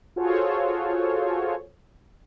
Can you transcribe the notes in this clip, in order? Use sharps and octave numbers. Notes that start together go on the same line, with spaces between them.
F4 F#4 G#4 A4 C5 C#5